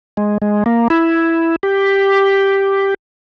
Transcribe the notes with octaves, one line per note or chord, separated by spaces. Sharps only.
G#3
G#3
A#3
E4
G4